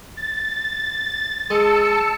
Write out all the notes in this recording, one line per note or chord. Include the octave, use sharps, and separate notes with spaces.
A6
G#3 A5 E6 C#7